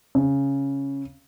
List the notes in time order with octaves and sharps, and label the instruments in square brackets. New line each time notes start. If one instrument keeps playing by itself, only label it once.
[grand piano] C#3